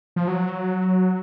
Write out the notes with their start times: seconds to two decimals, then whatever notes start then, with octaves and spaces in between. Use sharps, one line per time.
0.16 F3
0.28 F#3